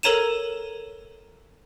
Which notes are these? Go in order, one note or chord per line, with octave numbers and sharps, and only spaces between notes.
A4 A#4 C#5 A#5 D#7 E7